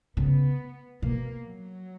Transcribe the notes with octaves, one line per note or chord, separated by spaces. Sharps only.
C#3 B3
B2 A#3
F#3